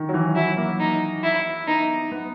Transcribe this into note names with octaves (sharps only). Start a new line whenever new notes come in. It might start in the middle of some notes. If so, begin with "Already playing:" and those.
Already playing: D#3
F#3
E3
F#3 E4
A#3
D#4
E4
B3 D#4
B3